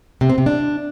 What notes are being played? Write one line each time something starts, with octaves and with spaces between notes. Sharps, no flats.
C3
C4
C3
D4